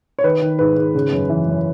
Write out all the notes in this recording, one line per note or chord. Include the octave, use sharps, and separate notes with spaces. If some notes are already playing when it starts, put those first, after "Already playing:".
C#5
D#3 B4
D#3
G#2 B4
G#2
C#3
F#2
E3
F#2